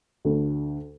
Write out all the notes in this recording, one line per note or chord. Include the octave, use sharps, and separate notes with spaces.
D2 D3 A3